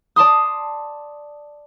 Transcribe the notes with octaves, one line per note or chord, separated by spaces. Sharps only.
D5 A5 C6 D#6